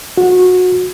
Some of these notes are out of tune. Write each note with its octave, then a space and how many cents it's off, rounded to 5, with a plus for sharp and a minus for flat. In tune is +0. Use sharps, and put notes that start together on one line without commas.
F#4 -20